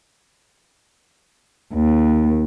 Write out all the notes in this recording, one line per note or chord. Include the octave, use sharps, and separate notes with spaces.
D#2